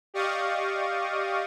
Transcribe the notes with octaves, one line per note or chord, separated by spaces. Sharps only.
G4 D5 D#5 F5 C#6 D#6